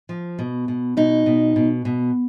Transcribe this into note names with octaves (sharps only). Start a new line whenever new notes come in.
F3
B2
B2
B2 D#4
B2
B2
B2